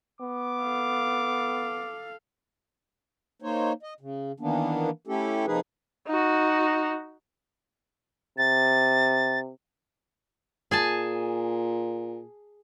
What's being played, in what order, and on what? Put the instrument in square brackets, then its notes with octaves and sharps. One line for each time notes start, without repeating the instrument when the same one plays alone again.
[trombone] B3 [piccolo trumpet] D6
[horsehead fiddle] A4 F5
[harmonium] A#3 D#4 C5 C#5
D#5
C#3
D#3 E3 A#3 B3 D4
A3 C#4 E4 G4 A4
C3 F3 A#3 D#4 G#4 B4
[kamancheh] D#4 F#4
[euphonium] C3 [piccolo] A6
[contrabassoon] A#2 [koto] G#4 G#5 A5